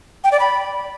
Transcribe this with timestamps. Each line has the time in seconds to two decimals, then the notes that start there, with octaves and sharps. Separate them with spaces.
0.24 G5
0.32 D5
0.40 B5